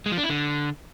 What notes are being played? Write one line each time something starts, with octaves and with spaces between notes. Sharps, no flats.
G#3
F3
D4
E4
D3